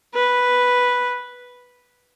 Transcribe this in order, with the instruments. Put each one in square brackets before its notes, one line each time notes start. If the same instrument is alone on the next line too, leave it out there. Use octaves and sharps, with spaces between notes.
[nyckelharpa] B4